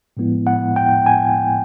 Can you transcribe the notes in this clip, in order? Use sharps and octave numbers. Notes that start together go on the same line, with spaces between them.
A2 F3 G#3 B3 E4
F#5
G5
G#5